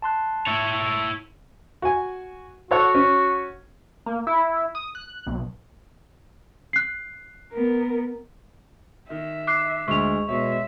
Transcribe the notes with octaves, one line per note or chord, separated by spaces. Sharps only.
A5 C6 F#6
E4 C#5
F#4 G#5
F#4 A4 C#5 F#5
C#4
A#3
E4
D#6
F#6
B1
F#6 C7
B3 A#4
D#3 E5
D6 F#6 C7
D2 G#3 C#6 F7
B2 G#3 C#5 E5